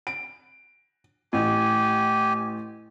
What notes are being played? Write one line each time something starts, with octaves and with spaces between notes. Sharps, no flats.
D7
A1 G4 G#5